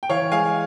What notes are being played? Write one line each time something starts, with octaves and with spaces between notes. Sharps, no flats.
G5
E3 C#5 F5
G#3 F5 G#5